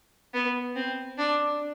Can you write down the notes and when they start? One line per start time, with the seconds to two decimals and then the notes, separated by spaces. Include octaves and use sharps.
0.34 B3
0.76 C4
1.18 D4